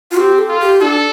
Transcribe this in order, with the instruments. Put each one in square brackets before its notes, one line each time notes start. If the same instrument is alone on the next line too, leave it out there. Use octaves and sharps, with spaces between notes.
[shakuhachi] F4
[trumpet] C4 [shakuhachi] G4
[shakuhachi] A4
[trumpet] F4
[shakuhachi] G4
[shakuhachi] D4 [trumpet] A4